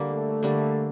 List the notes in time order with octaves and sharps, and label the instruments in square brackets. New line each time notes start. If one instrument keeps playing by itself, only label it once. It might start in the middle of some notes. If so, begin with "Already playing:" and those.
Already playing: [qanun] D3 G3 A#3
[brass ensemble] A3
[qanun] D3 G3 A#3